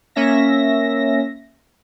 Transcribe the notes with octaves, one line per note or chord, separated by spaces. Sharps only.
A#3 C#4 E5 A#6